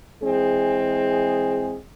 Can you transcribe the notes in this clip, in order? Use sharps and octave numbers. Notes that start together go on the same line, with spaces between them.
E3 G#3 C4 G#4